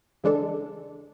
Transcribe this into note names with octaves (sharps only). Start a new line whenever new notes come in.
E2 C#3 G#3 D4 A4